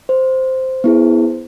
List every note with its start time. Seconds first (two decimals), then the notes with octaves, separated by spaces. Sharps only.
0.09 C5
0.84 B3 E4 G#4